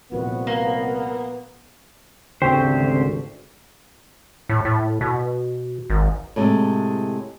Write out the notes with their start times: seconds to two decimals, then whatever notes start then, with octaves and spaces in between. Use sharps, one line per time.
0.12 C2 A#2 F3 B3 F#4
0.47 A#3
2.42 G#1 D2 C#3 C4 G4 C5 G5 C#6
4.49 A2
4.65 A2
5.01 B2
5.90 G#1
6.36 A2 C3 G#3